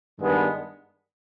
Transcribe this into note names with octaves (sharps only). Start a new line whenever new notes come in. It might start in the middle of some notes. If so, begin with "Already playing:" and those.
G2 D#3 G#3 B3 D4